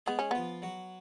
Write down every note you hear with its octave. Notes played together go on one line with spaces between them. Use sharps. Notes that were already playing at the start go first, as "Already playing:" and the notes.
G#3 B3 G#4
C#4
F3 B3 F4
F#3 F#4